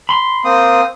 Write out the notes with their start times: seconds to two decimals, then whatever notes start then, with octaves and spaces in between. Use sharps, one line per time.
0.09 B5 C6
0.45 A#3 C4 D#6